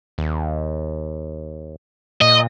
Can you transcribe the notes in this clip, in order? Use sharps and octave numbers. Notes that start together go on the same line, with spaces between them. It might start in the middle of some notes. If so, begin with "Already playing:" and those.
D#2
A#2 D#5